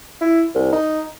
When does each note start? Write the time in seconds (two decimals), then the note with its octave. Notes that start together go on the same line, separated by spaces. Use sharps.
0.21 E4
0.55 C2
0.73 D#4